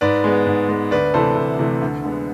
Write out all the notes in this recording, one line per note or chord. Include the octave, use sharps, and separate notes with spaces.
G#2 B4 D5
G#3 B3
G#2
G#3 B3
D2 B4 D5
C3 E3 A3 A4 C5
D2 A4
C3 E3 A3
D2
D3 G#3 B3